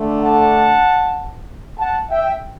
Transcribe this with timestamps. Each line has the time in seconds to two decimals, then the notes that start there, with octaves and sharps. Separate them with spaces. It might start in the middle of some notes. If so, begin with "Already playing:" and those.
Already playing: D3 A3 D4
0.21 F#5 A5
1.79 F#5 A5
2.10 E5 G5